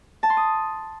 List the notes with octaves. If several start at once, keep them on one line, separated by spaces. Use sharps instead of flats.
A5
C6
D#6